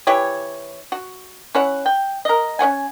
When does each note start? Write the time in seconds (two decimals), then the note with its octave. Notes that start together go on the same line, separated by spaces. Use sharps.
0.07 E3 E4 G4 C#5
0.92 F#4
1.55 C#4 E4 C#5 F#5
1.86 G5
2.25 A#4 D#5
2.59 C#4 C#5 F#5 G#5